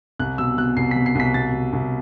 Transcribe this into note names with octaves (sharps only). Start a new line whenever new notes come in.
C2 F#6
B2 E6
B2 F#6
C2 C7
B2 B6
C7
C2 B6
B2 A6
B2
C2